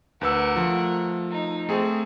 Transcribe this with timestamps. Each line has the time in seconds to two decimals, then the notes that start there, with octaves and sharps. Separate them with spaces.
0.21 D2 A#4 B4 F#5 E6
0.56 F3 A3
1.31 D#4
1.69 A3 C4 G#4